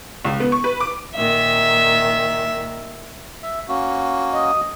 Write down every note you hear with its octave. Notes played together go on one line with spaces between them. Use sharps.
C#2
B3
C#6
B4
D6
A#2 D#3 E5
E5
A#3 C#4 F#4
D#5